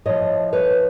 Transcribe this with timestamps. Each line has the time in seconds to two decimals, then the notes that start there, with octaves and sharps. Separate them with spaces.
0.05 A2 F3 C#5 D#5
0.53 B4 C#5